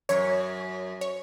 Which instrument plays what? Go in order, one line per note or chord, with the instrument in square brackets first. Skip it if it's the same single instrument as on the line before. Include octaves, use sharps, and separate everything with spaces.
[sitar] F#2 [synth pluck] C#5
[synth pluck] C#5